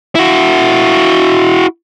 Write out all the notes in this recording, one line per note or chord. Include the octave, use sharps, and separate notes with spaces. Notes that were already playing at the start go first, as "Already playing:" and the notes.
E4 F#4